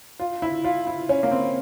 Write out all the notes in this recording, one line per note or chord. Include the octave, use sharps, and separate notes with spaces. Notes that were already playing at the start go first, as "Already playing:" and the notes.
F4
E4
F4
E4
C#4
A#3
C4